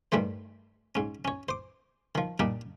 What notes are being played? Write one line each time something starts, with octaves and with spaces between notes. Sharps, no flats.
G2 D#3 G3 A3 C5
G#2 C#4
C#4 C#5
C5 D6
D#3 F3
A#2 G3 D4 D#4